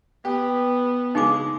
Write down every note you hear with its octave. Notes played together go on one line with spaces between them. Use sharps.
B3 G4
C#3 G#3 D#4 G#4 D6